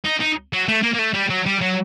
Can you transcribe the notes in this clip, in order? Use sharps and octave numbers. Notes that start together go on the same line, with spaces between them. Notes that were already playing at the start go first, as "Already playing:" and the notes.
D#4
D#4
F#3
A3
A#3
A#3
A3
G3
F#3
G3
F#3